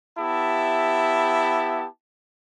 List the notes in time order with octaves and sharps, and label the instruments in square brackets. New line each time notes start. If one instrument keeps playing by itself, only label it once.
[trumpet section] B3 E4 G4 E5 A5